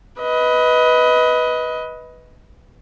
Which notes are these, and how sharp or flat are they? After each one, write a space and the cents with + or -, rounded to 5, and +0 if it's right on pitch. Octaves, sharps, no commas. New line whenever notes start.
B4 +0 D#5 +20